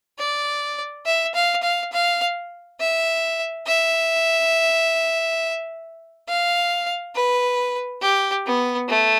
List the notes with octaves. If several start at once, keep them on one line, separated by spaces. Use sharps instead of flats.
D5
E5
F5
F5
F5
E5
E5
F5
B4
G4
B3
A3